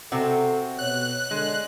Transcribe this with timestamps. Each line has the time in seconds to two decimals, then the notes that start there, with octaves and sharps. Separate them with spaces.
0.12 C3 C4 F#4 A4
0.79 B2 C#5 F#6
1.31 D3 G#3